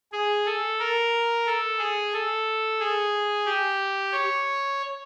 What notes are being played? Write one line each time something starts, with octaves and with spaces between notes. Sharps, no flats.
G#4
A4
A#4
A4
G#4
A4
G#4
G4
C#5